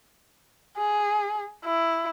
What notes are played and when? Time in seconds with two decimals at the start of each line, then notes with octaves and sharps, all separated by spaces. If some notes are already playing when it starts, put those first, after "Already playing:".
0.77 G#4
1.65 E4